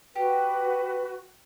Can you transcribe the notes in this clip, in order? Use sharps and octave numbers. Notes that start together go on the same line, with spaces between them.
F#4 G4 B4